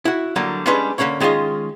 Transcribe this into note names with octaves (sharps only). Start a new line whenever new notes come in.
E4 F#4
D3 F#3 G3 A#3
G3 G#3 C#4 D4 B4 C6
D3 F#3 A#3 C#4 C#5
D#3 G#3 C#4 F4 D#5